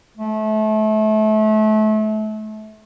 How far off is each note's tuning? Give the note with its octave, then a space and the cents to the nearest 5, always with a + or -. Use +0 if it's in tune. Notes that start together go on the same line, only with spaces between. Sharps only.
A3 -30